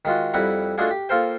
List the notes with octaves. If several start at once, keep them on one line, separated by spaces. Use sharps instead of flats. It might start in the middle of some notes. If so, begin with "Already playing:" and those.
D#3 G#3 F4 F#4
F2 G3 E4 F#5 A#5
A3 D4 D#4 F4 F#4 G#4
G4
A#3 F4 A4 A#4 C5 G5